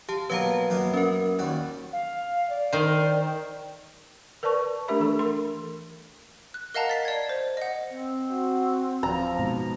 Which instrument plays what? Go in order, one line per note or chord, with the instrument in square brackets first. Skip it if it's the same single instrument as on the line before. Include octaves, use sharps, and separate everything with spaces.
[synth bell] G4 A5 [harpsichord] F5
[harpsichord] B2 F#3 A#3 [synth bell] B4 F5 A#5
[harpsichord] F#2 A#3 B3
[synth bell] C#4 A#4
[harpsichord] D#2 G3 F#4
[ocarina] F5
D5
[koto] D#3 C5
[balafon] A#4 B4 D5 A5 C#6
A3 D4 G4 A#4 E5 B5
E3 A4
A#4 C6
[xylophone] F#6
A#4 D#5 F5 F#5 A5 A#5
A6 B6 C7
D5 G#6
C5
D#5 F#5
[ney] C4
[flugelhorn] F#4
[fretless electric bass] D1 [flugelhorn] F3 [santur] A#5
[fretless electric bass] G#2 B2